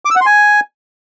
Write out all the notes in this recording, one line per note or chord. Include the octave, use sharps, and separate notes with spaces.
D6
E6
F#5
C6
G#5